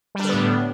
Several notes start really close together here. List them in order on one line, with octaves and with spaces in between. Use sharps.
G3 D4 D3 B3 A2